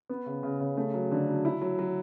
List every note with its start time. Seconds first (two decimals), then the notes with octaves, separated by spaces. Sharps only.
0.09 B3
0.26 C#3
0.43 C#3
0.60 C#3
0.77 A3
0.94 F#3
1.11 D3
1.28 F#3
1.45 E4
1.61 F#3
1.79 F#3